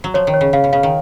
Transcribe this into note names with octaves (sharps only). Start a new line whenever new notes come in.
F#3
F3 C#5
D#3
C#5
C#3
C#3 F5
B2
C#3 F5
D#3